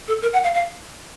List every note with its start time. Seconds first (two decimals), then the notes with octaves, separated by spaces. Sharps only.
0.08 A4
0.22 A#4
0.33 F#5
0.44 F5
0.54 F5